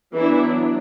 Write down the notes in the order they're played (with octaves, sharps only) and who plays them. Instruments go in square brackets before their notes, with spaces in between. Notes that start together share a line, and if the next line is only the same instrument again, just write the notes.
[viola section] E3 F#3 B3 D4 E4